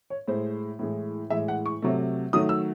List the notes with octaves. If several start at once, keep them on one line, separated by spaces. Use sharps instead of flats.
C#5
A2 G#3 C5
A2 E3 G#3
A2 E3 G#3 E5
F#5
C#6
C3 F#3 A3
D#3 F#3 A3 D#6
E6